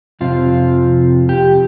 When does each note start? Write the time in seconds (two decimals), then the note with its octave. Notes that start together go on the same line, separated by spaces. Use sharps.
0.21 F2 C3 F3 C4 F4
1.29 G4